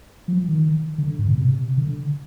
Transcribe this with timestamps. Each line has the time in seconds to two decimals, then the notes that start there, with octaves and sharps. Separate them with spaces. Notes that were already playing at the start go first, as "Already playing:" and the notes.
0.28 F3
0.48 D#3
0.98 D3
1.19 G#2
1.29 B2
1.38 C3
1.77 D3